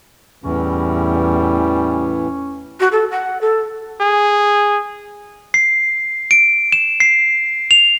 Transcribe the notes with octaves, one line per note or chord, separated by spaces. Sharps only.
E2 A2 E3 G3 C#4
F#4
A4
F#5
A4
G#4
C7
D7
E7
C7
F7